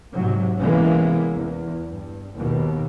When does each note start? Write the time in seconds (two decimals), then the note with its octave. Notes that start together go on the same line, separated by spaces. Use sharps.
0.16 G#2 C3 F#3
0.60 C3 E3 G#3 A#3 B3 C#4
1.37 E2
1.90 G2
2.35 D#2 B2